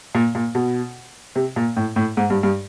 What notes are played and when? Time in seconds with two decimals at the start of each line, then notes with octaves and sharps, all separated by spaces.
0.15 A#2
0.35 A#2
0.55 B2
1.36 C3
1.56 A#2
1.76 A2
1.96 A2
2.17 G#2
2.30 G2
2.43 G2